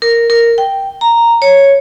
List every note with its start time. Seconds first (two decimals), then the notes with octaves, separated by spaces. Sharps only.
0.02 A#4
0.30 A#4
0.58 G5
1.01 A#5
1.42 C#5